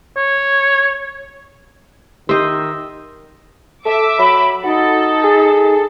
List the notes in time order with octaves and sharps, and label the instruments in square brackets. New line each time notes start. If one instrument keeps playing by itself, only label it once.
[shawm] C#5
[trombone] D#3 [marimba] G4 [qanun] D#5 E5 [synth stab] C6 G6
[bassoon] A4 [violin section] E5 D6
[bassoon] F#3 [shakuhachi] B5
[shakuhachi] D#4 [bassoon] F#4 [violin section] A4
[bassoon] G#4